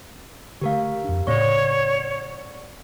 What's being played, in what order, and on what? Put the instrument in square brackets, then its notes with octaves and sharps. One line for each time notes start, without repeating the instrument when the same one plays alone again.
[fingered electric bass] D3 A3 [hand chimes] G4 A#4 F5
[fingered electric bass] F2 D4
[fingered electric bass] A2 C#3 [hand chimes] C4 D5 C#6 [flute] C#5